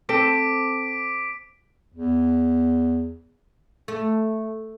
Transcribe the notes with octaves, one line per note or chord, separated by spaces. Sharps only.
C4 A4 D6 B6 D7
E2
A3